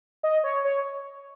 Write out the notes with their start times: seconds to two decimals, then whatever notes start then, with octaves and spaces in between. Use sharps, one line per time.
0.23 D#5
0.44 C#5
0.64 C#5